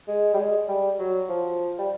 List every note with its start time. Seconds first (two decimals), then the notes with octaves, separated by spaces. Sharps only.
0.08 G#3
0.34 G3
0.38 G#3
0.68 G3
0.99 F#3
1.29 F3
1.78 G3